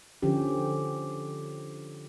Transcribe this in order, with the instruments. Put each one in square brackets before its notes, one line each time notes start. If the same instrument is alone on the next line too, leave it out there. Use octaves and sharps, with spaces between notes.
[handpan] D3 F3 C#4 G4